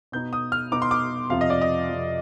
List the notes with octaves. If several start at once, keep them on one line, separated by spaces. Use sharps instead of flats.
B2 B3 D#4 G6
D#6
F6
B2 B3 D#4 D6
C6
D6
F2 C3 F3 F5
D#5
D5
D#5
F2 C3 F3